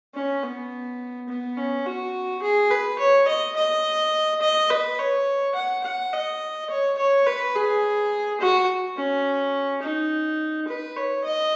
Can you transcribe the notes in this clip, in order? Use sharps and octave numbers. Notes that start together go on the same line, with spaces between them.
C#4
B3
B3
C#4
F#4
G#4
B4
C#5
D#5
D#5
D#5
B4
C#5
F#5
F#5
D#5
C#5
C#5
B4
G#4
F#4
C#4
D#4
B4
C#5
D#5